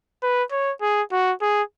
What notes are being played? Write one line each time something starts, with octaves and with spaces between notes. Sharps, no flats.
B4
C#5
G#4
F#4
G#4